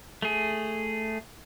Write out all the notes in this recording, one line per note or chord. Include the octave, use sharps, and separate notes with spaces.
A3 G#4